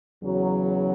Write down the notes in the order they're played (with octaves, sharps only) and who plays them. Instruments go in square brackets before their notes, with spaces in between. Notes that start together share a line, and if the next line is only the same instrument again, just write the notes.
[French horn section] E2 C#3 F#3